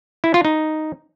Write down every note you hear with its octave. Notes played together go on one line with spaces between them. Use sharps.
E4
F4
D#4